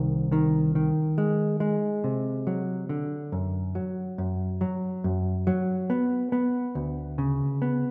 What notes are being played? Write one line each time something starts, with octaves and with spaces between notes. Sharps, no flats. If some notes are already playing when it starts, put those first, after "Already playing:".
Already playing: C2 D#3
D#3
D#3
G#3
G#3
C3
F#3
D3
F#2
F#3
F#2
F#3
F#2
F#3
B3
B3
D2
C#3
B3